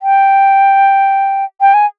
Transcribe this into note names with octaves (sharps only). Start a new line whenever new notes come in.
G5
G5
G#5